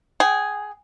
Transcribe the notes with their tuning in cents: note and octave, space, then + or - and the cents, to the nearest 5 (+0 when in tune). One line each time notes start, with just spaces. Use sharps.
G#4 +0 G5 -40